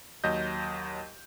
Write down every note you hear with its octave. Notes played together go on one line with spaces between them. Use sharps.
D#2 F#3 D#5 G6